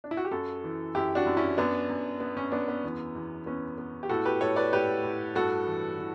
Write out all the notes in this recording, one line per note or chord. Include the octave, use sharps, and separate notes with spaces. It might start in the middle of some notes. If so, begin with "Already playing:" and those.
D4
E4
F#4
G4
F#2 F#4 A4
E3
F#2 E4 G4
D4 F#4
F#2
C#4 E4
F#2 B3 D4
F#2
B3
C#4
F#2 B3 D4
B3
E2
E2
B3 C#4
B3
G4
A2 F#4 A4
G4 B4
A2 A4 C#5
B4 D5
A2 G4 B4
A2
G2 F#4 A4
E3
E3